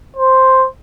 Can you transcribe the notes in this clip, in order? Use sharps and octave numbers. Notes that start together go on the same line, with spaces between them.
C5